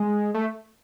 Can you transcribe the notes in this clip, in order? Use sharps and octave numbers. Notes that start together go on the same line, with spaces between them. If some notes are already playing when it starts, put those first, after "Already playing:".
Already playing: G#3
A3